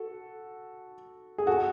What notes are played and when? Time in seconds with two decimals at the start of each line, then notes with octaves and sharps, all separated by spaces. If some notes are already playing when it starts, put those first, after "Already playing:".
Already playing: F#4 A4
1.38 G#4
1.47 F#4 A4